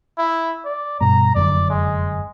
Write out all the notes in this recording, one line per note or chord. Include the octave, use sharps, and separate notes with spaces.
E4
D5
G2 B2 A#5
F1 F#2 D3 D5
G#3